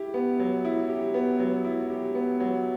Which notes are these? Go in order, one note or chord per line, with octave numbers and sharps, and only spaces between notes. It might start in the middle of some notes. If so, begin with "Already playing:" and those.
Already playing: E4 G4
B3
F#3
E4
G4
B3
F#3
E4
G4
B3
F#3